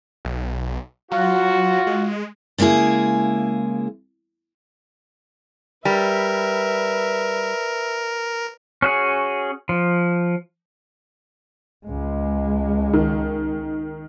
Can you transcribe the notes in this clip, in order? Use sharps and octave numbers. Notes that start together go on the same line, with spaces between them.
B1
F#3 F4 F#4
G#3
C#3 G#3 A#3 E4 G#4
G3 A#4 B4 E5
C#4 F#4 G#4
F3
C#2 G#3
D#3